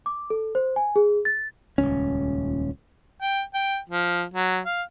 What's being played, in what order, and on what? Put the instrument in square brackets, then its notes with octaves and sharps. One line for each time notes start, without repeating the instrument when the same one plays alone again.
[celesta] D6
A4
C5
G#5
G#4
A6
[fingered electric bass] D#1 G#1 C#2 C#4
[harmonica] G5
G5
F3
F#3
F5